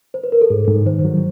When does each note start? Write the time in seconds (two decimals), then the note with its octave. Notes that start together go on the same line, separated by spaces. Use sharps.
0.14 C5
0.24 B4
0.32 A#4
0.41 A4
0.50 G#2 G#4
0.68 G#2
0.86 D#3 C5
1.05 F#3